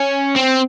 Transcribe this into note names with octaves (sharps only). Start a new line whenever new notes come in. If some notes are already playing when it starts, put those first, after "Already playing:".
Already playing: C#4
C4